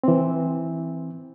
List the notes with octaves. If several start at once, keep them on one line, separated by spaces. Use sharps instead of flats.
E3 C4